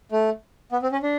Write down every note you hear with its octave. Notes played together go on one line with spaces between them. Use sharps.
A3
B3
C4
C#4
D4